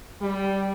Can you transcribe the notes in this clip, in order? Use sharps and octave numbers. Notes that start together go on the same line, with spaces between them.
G3